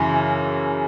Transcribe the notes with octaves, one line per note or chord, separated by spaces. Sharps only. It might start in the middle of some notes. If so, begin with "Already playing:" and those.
Already playing: F#2 C#3 E3